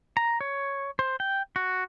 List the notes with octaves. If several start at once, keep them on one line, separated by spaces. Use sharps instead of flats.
A#5
C#5
C5
G5
F#4